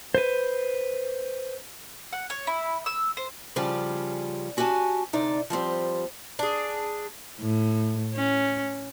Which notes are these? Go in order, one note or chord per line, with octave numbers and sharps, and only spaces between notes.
B4 C5
F#5
C#5
E4
E6
C5
C#3 F3 G3 C#4 F4 G4
C#4 F#4 G4 F#5 G#5 A5
D2 C3 D#4 D5
F3 G3 C4 G4
D4 G#4
A2
C#4